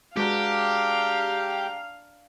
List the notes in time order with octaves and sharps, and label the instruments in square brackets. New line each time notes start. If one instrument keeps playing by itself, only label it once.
[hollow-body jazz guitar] G#3 F#4 B4 [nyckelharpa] D4 A#5 [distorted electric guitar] G4 [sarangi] F5